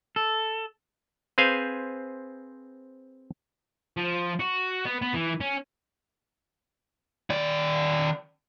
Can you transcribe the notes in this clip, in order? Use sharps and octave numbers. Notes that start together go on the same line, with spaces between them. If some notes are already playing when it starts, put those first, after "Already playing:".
A4
C4 G#4 B4 C5 F5 G#5
F3
F#4
B3
B3
E3
C#4
D#3 D5